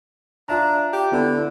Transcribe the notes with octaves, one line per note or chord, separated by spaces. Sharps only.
D4 F4 E5 A#5
G4
D3 B3 E4